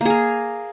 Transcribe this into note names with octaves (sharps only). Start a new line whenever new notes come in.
A#3 G#4 A#4